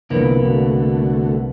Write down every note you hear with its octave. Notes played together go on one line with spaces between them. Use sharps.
C2 F2 D3 E3 A#3 B3
D3 A3 F#4